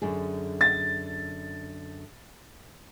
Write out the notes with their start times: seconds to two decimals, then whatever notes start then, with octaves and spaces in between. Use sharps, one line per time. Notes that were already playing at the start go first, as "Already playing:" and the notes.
0.02 F#2 D3 G#4
0.61 A6